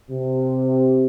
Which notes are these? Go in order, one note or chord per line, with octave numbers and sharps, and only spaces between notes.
C3